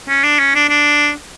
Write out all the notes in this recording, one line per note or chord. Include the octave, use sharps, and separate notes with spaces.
C#4
D4
C#4
D4
D4